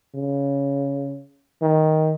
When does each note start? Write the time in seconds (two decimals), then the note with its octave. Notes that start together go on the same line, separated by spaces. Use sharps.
0.15 C#3
1.62 D#3